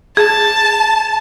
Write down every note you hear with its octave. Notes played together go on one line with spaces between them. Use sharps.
G#4 A5